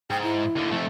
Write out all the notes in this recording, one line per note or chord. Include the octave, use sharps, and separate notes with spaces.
G#2 G5
E4
D#2 D3
F2 A3